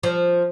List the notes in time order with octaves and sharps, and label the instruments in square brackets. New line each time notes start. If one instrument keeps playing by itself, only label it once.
[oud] F3